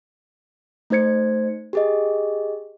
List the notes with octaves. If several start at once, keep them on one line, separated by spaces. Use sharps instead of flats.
A3 D#4 C5 G#6 C#7
G4 G#4 D#5